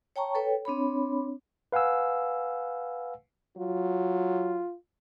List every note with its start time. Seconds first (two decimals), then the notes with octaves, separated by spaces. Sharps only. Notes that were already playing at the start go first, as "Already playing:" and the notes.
0.16 C#5 G5 A5 A#5 C#6
0.35 A4 B4 C#5 G5
0.65 C4 D4 C#5 B5
1.72 B4 F5 F#5 G#5 E6
3.58 F#3 F4